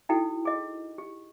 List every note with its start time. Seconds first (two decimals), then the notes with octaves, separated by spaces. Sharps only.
0.09 D#4 E4 F#4 A4 G5
0.45 G#4 D#5
0.98 G4